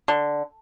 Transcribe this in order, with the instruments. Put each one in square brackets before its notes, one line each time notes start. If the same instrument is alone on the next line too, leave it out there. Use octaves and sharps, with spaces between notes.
[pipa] D3